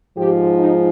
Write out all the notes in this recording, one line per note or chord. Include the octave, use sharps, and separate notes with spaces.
G#2 F3 G4
D#4